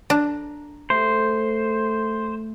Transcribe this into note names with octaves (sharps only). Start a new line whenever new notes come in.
D4 A#5
A3 C5